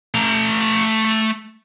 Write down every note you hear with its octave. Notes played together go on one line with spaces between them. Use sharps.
A3 A#5